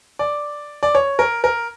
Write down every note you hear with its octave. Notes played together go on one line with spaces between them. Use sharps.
D5
D5
C#5
A#4
A#4